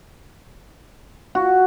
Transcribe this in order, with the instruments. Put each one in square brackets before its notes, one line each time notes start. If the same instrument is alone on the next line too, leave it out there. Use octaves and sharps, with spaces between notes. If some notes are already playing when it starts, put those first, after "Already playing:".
[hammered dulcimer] F#4